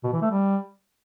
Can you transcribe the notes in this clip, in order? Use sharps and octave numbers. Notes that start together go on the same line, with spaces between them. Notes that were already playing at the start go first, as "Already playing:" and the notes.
B2
E3
A3
G3